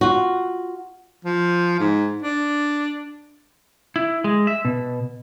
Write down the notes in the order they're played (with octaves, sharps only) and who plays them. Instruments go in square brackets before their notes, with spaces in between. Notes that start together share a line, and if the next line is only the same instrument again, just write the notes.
[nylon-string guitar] F4 F#4
[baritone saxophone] F3
G#2
D4
[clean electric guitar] E4
G#3
E5
B2